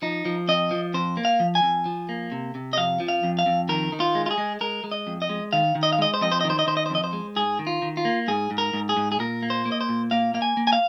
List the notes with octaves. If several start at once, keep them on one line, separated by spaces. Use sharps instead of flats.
F3 D#4
F3
F2 D#5
F3
F2 C5
A#3
F5
F3
G#5
F2
F3
A#3
C3
C3
D#5
F2 F5
F3
F5
F2
F5
F2
D#3 A#4
D#3
F4
G#3
F4
G#4
G#3
G#3 A#4
G#3
D#5
F2
D#5
G#3
D#3 F5
D#3
D#5
F5
G#3 D#5
C5
F2 D#5
C5
D#5
D#3
C5
D#5
D#3 C5
D#5
C5
F2 D#5
C5
G#3
G#2 G#4
D#3
F4
D#3
F4
A#3
G#2 G#4
G#2
A#4
G#2
G#4
G#2
G#4
A#2 A#4
A#3
C5
A#3
D#5
C5
A#2
A#3 F5
A#3 F5
G#5
A#3
G#5
F5